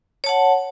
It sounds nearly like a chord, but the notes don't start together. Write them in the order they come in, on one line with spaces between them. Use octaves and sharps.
C#5 A5 F#5